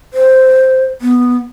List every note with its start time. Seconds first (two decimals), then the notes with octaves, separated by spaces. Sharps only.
0.13 C5
1.01 B3